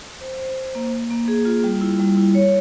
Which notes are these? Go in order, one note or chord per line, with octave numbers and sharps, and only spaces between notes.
C5
C5
C5
A#3
A#3
A#3
G#4
F4
G3
E4
G3
E4
C#5